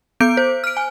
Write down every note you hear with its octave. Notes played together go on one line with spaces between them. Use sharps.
B3 D6 G6 D7
C5
F6 D7
G#5